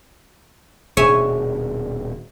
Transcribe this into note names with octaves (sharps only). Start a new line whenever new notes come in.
D#1 B2 D4 G#4 C#5 E5 G#5